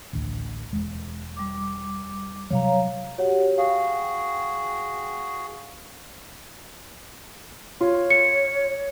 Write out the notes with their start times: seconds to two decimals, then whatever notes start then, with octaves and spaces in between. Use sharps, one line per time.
0.13 A1 D2
0.73 E1 G#3
1.37 G3 D6
2.50 C3 F#3 G3 C#5 F5 A#5
3.18 F#4 G4 C#5 F#5
3.58 F#4 G#4 F5 G5
7.81 F4 C#5
8.10 C#7